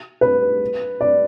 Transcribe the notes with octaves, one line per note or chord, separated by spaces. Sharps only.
B4
D5